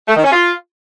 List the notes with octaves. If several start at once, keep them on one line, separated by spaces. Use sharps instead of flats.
A3
D#3
C#4
F4